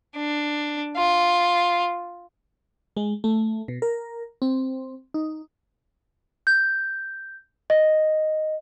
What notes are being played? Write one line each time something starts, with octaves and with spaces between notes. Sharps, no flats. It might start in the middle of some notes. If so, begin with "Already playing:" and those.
D4
F4
G#3
A3
B2
A#4
C4
D#4
G6
D#5